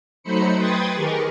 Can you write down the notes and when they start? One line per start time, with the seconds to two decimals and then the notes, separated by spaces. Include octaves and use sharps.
0.23 F#3 A3 D#4 C5 B5 C#7
0.55 B4 G5 C6 D#6 G#6 A6
0.95 D#3 G4 G#4 A#4 C#6